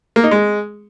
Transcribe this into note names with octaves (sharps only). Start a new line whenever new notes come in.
A#3
D#4
G#3